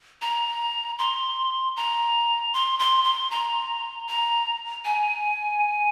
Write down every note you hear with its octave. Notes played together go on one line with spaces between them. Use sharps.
A#5
C6
A#5
C6
C6
C6
A#5
A#5
G#5